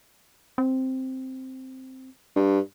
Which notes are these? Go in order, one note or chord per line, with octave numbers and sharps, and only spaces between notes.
C4
G2